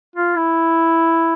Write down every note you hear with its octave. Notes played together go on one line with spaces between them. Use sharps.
F4
E4